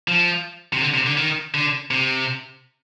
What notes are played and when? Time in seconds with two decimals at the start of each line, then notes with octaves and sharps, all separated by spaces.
0.08 F3
0.74 C3
0.81 D3
0.94 C3
1.06 D3
1.17 D#3
1.54 D3
1.91 C3